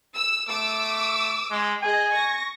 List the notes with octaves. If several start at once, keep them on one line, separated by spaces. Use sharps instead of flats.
E6
A3 D6 E6
G#3
G#4 D#5 G#5
C#6 A#6